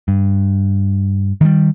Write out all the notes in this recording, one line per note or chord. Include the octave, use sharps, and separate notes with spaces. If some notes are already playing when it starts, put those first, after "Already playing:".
G2
D#3 F3 G3